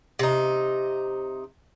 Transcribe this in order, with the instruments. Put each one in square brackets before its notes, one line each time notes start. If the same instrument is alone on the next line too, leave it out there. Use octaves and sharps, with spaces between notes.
[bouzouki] C3 D#4